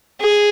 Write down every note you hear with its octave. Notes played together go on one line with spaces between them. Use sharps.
G#4